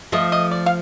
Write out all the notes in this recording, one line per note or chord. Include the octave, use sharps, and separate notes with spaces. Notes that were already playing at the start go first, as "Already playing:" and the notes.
F3 A3 D#5
D#5
D5
F5